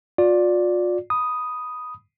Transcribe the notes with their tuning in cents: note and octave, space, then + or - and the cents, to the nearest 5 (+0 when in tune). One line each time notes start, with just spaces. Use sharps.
F4 +40 D5 +0
B5 +0 D#6 +0